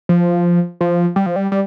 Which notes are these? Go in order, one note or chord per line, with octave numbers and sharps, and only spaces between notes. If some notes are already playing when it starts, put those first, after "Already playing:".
F3
F3
G3
F3
G3
G3